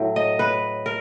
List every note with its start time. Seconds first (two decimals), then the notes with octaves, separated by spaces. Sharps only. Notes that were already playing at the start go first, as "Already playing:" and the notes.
Already playing: A2 F#3
0.16 D#5
0.39 B4
0.86 A#4